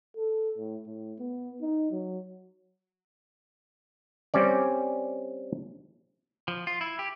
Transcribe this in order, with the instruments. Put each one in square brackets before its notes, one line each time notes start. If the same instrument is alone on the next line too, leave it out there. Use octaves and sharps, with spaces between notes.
[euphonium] A4
A2
A2
B3
D#4
F#3
[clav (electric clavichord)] G3 C4 C#4 D5
[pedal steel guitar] F3
F4
E4
G4